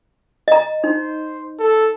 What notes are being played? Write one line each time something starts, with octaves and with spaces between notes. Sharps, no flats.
D#5 A#5
D#4 C5
A4